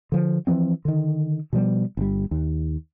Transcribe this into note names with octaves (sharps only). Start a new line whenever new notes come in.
D3 F3
E3 F3 G3 C4
D3 D#3
B2 F3 G3 B3
G1 G3
D#2